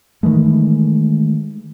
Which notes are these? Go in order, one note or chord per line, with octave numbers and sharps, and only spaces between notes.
D#3 E3 G#3 A3